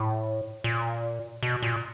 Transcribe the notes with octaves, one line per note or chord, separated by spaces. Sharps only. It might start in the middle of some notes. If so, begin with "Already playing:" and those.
Already playing: A2
A#2
B2
A#2